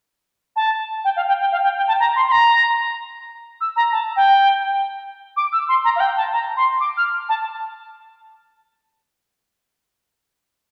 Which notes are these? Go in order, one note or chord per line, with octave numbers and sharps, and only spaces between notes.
A5
G5
F5
G5
G5
F5
G5
G5
A5
A#5
C6
C6
A#5
E6
A#5
A5
G5
D6
E6
C6
A#5
F5
G5
A5
A#5
C6
D6
F6
A5